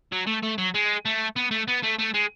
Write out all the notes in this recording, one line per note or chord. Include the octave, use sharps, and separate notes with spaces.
F#3
A3
A3
F#3
G#3
A3
B3
A3
B3
A3
A3
G#3